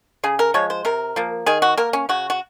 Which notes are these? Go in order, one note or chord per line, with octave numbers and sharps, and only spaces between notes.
C#3 G#4
A#4
F3 G#3 C#5
C5
C3 A#4
F3 A#3
D#3 G#4
F#4
A#3 A#4
C#4
C#3 F#4
F#4